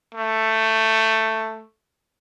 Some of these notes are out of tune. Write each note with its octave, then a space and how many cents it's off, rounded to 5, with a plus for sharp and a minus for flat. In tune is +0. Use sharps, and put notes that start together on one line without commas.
A3 +10